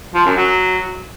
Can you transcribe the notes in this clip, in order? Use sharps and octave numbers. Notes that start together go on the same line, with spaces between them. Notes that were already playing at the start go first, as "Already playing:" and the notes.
F3
F#2
F#3